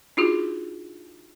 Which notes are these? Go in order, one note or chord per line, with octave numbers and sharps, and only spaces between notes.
D4 D#4 F4 F#4 G#4